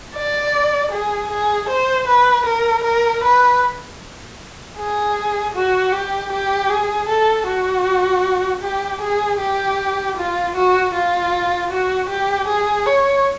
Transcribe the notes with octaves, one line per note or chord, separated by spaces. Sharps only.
D5
G#4
G#4
C5
B4
A#4
A#4
B4
G#4
F#4
G4
G4
G#4
A4
F#4
G4
G#4
G4
F4
F#4
F4
F#4
G4
G#4
C#5